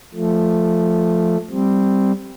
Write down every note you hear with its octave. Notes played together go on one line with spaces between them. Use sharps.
F3 A3
G3 C4